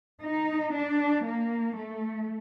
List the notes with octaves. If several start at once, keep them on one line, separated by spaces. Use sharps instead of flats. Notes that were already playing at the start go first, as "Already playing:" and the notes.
D#4
D4
A#3
A3